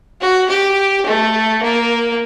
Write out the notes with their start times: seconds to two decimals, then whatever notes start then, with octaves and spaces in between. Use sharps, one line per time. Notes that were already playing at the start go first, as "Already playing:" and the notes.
0.21 F#4
0.49 G4
1.07 A3
1.63 A#3